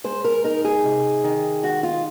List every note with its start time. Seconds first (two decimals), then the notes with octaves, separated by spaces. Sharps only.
0.04 G#3 C5
0.24 A#4
0.44 D#4 A#4
0.65 G#4
0.84 C3
1.24 D#3
1.63 G#3 F#4
1.83 F4